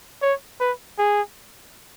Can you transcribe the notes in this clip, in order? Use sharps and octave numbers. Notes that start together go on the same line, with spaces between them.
C#5
B4
G#4